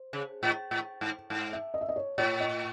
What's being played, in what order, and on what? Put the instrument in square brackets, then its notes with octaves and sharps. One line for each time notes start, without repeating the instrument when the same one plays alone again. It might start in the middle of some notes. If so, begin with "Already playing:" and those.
Already playing: [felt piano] C5
[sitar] C#3
A2
A2
G#2
G#2
[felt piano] E5
D#5
E5
D#5
C#5
[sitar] A2 [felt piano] C#5
[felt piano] D#5